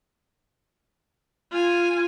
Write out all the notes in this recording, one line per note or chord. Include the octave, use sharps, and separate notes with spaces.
F4 G#5